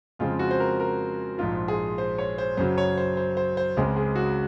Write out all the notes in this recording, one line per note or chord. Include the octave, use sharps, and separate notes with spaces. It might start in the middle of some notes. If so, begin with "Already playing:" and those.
F2 C#3 G#3 C4 F4
F#4
C5
A#4
A#4
A#1 G#2 F3 F4
G#4
C5
C#5
C5
F#2 C#3 F#3 C5
C#5
C5
C5
C5
C5
C#2 C#3 G#3 C4
G#4
F#4